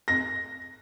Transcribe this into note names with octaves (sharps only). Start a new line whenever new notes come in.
A#6